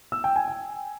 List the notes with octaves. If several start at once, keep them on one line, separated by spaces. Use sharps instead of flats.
E6
G5
G#5
G#5